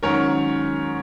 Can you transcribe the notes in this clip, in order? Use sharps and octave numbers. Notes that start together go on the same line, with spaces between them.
G#2 D#3 F#3 C#4 A#4 C#5